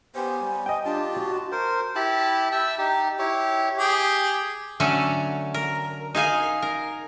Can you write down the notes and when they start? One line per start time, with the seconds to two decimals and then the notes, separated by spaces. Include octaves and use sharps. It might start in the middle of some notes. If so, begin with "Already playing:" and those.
0.15 B3 G4 C5 G#5
0.41 G3
0.66 D#5 G5
0.85 D4 F4 G4 A5
1.13 F#4
1.52 A#4 C5
1.95 E4 G4 A5 B5
2.52 E5 G5 A5 E6
2.79 D#4 G4
3.19 E4 G4 C#5
3.78 G4 G#4
4.80 D3 F#3 A3 C#4 A4
5.54 A#4
6.15 D#4 G#4 F5 G#5
6.62 A#4